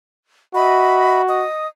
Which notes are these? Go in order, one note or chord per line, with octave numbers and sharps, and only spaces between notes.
F#4 D#5 E5 B5
D#5 D#6